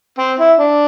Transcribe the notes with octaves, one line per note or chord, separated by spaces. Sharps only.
C4
E4
D4